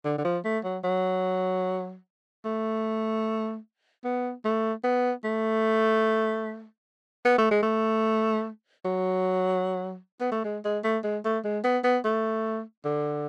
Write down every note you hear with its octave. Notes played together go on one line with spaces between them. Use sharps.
D3
D3
F3
A3
F#3
F#3
A3
B3
A3
B3
A3
B3
A3
G#3
A3
F#3
B3
A3
G#3
G#3
A3
G#3
A3
G#3
B3
B3
A3
D3